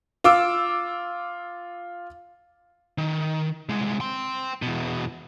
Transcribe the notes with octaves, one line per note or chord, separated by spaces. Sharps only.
F4 D6 E6
D#3
C2 G#3
G5 C6
E2 B2